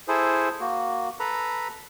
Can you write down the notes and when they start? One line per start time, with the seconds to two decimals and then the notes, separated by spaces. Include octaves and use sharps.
0.08 E4 G#4 A4 C5
0.60 A#3 F#4
1.20 A4 B4 A#5 B5